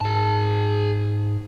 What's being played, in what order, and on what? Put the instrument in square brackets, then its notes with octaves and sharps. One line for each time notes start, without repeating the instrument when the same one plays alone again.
[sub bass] G#2 [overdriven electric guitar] G#4 A5